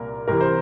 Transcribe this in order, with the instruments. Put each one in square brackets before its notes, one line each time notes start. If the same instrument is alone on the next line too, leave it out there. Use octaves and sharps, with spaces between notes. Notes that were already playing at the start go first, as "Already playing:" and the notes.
Already playing: [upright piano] C2 A#2 A#4
C2 C3 E3 A#4
C5